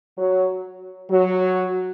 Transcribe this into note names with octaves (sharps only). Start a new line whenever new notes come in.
F#3
F#3